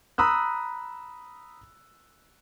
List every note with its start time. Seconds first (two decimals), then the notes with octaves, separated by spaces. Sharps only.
0.18 A#5 B5 D#6 E6 F#6